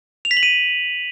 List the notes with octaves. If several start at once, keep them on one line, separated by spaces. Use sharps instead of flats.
F7
B6
F#7
D#7